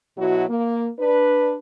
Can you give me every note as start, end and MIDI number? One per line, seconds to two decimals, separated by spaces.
0.18 0.44 47
0.18 0.44 54
0.18 0.44 64
0.18 0.44 66
0.49 0.88 58
0.99 1.56 62
0.99 1.56 71